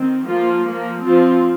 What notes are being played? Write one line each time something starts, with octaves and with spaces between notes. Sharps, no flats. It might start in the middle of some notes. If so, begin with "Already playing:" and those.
Already playing: D#3 C4
F3 A#3 F4
F3 A#3
F3 C4 F4